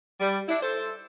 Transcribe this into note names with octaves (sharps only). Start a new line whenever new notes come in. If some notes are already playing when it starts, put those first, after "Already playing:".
G3
D4 E4
A4 C5